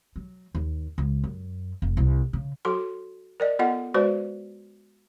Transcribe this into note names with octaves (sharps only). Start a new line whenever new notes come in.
F#3
D#2
C#2
F#2
F1
C2
C#3
F#3 F#4 A4 C6
A#4 D5 D#5
B3 F4 A4 D#5 F#5
G#3 F#4 B4 C5 D5